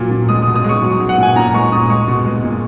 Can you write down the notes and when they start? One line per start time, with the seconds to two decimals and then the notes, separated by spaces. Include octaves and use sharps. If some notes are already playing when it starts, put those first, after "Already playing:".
Already playing: A#2 F3 F#3
0.11 A#2
0.29 G#3 D#6
0.42 D#6
0.47 B2
0.56 D#6
0.64 G#3 C#6
0.82 F#3
1.00 F#3
1.09 F#5
1.18 A#2 G#5
1.36 A#2 A#5
1.54 G#3 C#6
1.72 A#2 D#6
1.90 G#3 C#6
2.08 B2
2.26 G#3
2.44 A#2